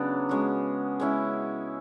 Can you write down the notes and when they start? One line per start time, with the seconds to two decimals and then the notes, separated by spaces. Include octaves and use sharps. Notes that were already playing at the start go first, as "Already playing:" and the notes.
Already playing: C#3 F#3 B3 D4
0.29 G#3 C#4 F#4
1.00 G#3 C#4 E4